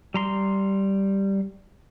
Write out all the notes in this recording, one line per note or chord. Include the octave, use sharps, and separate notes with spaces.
G3 A#5 C6